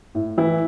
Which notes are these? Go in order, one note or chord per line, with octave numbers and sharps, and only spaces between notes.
A2
E3 E4